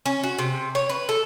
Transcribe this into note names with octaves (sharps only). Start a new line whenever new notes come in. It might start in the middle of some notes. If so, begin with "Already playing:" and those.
C#4
F#4
C3
C#5
B4
A4